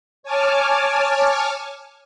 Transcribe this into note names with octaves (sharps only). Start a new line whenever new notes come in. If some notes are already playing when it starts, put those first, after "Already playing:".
C#5 G#5 A5 D6 F6